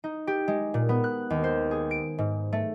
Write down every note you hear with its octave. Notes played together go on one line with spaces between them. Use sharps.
D#4
G4
G#3
A#2
B3
F#6
D#2
C5
G#4
D7
G#2
A3